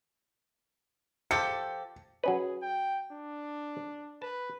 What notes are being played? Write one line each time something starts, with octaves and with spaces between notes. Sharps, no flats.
F3 G4 A4 C#7
F#3 C#4 G#4 B4
G5
D4
B4 A5